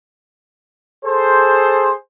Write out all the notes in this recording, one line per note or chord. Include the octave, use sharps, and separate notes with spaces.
G#4 A4 C5